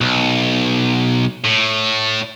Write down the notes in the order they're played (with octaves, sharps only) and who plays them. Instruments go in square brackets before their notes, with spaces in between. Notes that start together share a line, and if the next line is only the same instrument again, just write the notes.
[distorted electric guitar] B1
A2